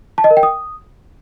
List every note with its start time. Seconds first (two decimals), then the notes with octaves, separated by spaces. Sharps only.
0.18 A5
0.24 D#5
0.30 A#4
0.37 G5
0.43 D#6